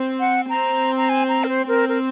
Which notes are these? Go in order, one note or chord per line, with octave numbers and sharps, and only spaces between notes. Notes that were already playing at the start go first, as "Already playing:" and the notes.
Already playing: C4
F#5
C4 A#5
A#5
G#5
A#5
A#4
C5
C4 A#4
A#4